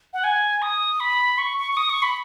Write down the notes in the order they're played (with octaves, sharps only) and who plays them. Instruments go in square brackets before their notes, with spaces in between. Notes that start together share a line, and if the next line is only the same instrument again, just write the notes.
[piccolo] F#5
G#5
D#6
B5
C#6
C#6
C#6
D#6
C#6
B5